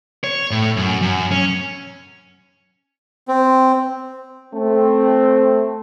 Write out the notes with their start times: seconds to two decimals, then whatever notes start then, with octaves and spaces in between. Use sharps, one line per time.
0.24 C#5
0.51 A2
0.77 F#2
1.02 F#2
1.31 C#4
3.28 C4
4.54 A3 C4